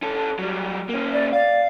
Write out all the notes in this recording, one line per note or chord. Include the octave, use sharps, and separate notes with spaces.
C#4 A4
F#3 G3
A#3 C#4
D5
D5 F5